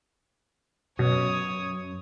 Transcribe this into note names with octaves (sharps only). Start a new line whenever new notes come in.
F#2 B2 C#5 D#6